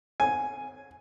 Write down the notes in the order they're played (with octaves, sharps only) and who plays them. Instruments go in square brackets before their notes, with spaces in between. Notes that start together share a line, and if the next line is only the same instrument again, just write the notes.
[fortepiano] G#5